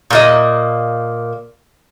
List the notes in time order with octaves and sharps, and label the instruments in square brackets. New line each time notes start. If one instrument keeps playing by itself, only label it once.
[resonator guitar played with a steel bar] A#2 A#3 D#5